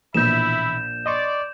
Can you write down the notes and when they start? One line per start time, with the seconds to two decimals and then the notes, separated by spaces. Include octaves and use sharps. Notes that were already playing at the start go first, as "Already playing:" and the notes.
0.14 A#1 B2 E3 E4 E5 B5 G6 E7
1.06 D5 D#5 C6 C#6